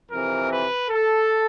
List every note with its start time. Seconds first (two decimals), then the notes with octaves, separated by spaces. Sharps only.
0.11 F2 C3 E3 A#4
0.50 B4
0.89 A4